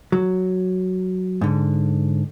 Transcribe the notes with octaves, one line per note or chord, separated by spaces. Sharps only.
F#3
G#2 D3